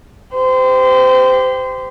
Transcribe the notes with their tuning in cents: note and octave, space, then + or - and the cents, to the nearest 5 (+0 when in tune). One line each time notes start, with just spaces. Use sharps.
G4 +0 C5 -30